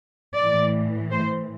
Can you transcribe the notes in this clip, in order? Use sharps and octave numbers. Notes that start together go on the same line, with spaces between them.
A2 E3 D5
C5